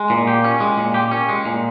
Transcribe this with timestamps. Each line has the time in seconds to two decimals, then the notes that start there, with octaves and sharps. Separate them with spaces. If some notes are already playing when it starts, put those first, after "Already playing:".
Already playing: G#3
0.10 A#2
0.27 G4
0.44 C#4
0.60 G#3
0.78 A#2
0.94 G4
1.11 C#4
1.29 G#3
1.45 A#2